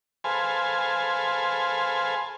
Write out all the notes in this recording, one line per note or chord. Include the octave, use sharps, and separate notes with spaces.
G#4 A4 B4 C5 F5 G#5